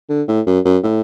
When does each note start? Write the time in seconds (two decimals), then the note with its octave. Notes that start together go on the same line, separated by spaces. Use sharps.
0.09 D3
0.28 A2
0.47 F#2
0.65 F#2
0.83 A2